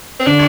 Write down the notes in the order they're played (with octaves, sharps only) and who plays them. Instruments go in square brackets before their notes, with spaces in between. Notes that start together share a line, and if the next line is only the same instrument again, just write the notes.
[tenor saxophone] C4
[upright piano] D3 [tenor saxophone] D4